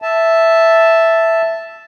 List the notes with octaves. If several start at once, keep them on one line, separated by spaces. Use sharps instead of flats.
E5 A5